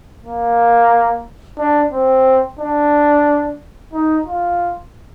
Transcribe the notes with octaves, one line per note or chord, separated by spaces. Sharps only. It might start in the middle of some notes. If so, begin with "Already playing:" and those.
A#3
D4
C4
D4
D#4
F4